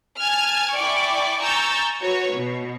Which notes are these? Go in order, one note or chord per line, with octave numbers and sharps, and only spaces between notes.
G#5 A5 F6 G#6
E4 D5 G5 G#5 C#6 D6
G#5 A#5 C#6 E6 G6 A6
F#4 B4 C#5 C#6
B2